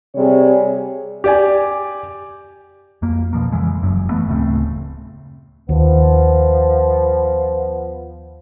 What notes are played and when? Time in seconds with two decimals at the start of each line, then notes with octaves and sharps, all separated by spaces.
0.15 C3 G3 G#4 C#5
1.24 G4 D5 G#5
3.02 F2 A#3
3.33 B2 F3 A#3
3.52 F2 C#3 E3 G#3
3.83 F#1 F#2
4.09 E3 A3 B3
4.29 D1 C#3 A3 C4
5.69 D#2 F3 B3